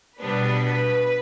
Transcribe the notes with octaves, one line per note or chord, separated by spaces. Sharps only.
B2 G3 B3 D4 B4